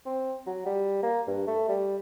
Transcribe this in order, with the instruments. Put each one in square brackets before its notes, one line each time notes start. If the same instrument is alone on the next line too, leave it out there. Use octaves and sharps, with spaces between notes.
[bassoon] C4
F#3
G3
A#3
G2
A3
G3